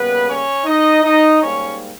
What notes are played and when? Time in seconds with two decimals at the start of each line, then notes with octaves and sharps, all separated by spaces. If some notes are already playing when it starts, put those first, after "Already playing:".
Already playing: C#3 G3 A#3 B3 B4
0.27 C#4 C#5
0.65 D#4 D#5
1.03 D#4 D#5
1.40 G#2 G3 A#3 C#4 C#5